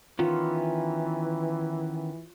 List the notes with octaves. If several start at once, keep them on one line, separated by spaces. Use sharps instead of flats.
D#3 E3 B3 C#4 F4